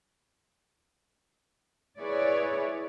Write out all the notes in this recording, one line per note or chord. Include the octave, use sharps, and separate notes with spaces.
E4 G#4 B4 C#5 D5